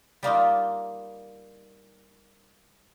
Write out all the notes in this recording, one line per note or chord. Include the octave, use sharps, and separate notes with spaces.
G3 A#3 D#4 F4